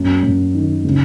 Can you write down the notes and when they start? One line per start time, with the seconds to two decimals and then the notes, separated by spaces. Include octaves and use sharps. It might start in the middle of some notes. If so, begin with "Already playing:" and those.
Already playing: F#2
0.23 F#2
0.54 D#3
0.85 C#3